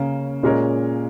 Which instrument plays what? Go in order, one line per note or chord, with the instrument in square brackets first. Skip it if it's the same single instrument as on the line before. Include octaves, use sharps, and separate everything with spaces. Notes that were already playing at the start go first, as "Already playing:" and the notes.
Already playing: [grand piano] C#3 [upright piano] A#3 C#4
[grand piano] A#2 [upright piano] G#3 C#4 A#4 C#5